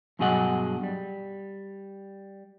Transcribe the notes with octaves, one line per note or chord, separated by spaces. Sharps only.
G2 B2 F#3 G#4 D#5 F#5
G3